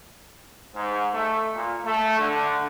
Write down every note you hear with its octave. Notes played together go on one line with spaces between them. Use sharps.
G#2
A3
A#2
A3
D3